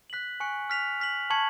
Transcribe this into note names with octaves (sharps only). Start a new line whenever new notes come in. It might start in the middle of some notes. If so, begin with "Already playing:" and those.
F#6 B6 F#7
G#5 C#6 F#6 C#7
F6 B6 F7
F6 B6 F#7
A5 C#6 G#6 C#7 F#7